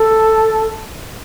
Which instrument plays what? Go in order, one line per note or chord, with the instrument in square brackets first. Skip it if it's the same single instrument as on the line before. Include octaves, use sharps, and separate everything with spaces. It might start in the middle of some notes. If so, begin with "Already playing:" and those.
Already playing: [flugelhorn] A4